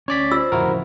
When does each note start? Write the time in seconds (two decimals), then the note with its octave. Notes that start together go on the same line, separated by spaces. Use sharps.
0.08 D2 C#4 C#5 D5 B6
0.31 F4 C5 E6
0.52 D1 F2 C#3 E4 F#4 A#4